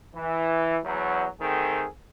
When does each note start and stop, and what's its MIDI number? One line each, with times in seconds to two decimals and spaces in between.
0.14 0.76 52
0.85 1.25 40
0.85 1.25 54
1.40 1.85 51
1.40 1.85 57
1.40 1.85 60
1.40 1.85 68
1.40 1.85 69